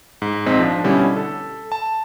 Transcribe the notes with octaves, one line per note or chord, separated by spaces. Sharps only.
G#2
A#1 G#2 C4 D#5 B6
F3 D4
B2 D3 G3 C#4 E4
A4
A5